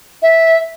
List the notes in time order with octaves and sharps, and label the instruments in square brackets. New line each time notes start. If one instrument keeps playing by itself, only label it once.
[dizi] E5